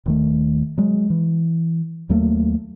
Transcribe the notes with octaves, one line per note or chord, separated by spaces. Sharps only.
D#1 D#3 A3
F#3 G#3
E3
D#2 F#3 A3 A#3